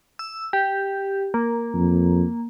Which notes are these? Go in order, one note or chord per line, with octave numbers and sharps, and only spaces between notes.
E6
G4
A#3
F2